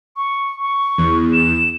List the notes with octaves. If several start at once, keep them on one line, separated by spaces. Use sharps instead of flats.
C#6
C#6
E2
E7